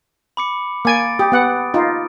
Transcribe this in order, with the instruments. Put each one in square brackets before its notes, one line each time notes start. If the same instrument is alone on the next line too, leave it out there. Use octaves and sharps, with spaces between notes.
[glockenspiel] B5 D6 C#7
[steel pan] A#3 G#5 [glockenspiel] D6 A6 D7
[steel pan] G4 [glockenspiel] D#6
[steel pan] B3 F#5
D#4 F4